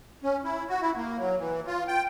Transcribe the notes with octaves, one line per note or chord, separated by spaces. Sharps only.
C#4
E4
F#4
E4
A#3
F#3
E3
F4
G5